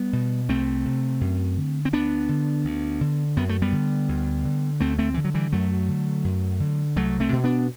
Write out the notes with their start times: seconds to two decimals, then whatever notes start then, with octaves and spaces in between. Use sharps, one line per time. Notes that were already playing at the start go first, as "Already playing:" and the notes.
Already playing: G3 B3
0.13 B2
0.49 C2 A3 C4
0.85 C3
1.21 F#2
1.57 D3
1.85 C4
1.93 D2 B3 D4
2.29 D3
2.65 D2
3.01 D3
3.37 F#2 B3
3.49 A3
3.62 G3 B3
3.72 D3
4.09 D2
4.45 D3
4.80 D2 A3 C4
4.99 A3 C4
5.14 D3 E3
5.24 F#3
5.34 E3 G3
5.52 F#2 F#3 A3
5.88 D3
6.24 F#2
6.60 D3
6.96 C2 F#3 A3
7.20 A3 C4
7.32 B2
7.44 B3 D4